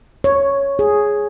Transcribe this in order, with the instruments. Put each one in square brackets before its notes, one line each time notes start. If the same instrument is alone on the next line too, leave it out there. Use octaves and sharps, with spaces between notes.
[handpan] C#5
G#4